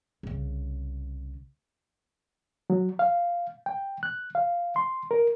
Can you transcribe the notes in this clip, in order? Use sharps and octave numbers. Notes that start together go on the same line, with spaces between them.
C2 C#3
F#3
F5
G5
F#6
F5
C6
A#4